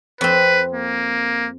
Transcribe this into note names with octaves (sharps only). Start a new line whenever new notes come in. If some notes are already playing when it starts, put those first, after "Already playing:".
F2 C4 B4
A#3